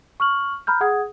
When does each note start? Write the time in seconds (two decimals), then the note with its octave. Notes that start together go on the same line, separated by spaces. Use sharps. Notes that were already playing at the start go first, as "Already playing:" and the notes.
0.20 C#6 F6 F#7
0.67 A#5 B5 F6 G6
0.81 G#4 F#5 D#6 G#6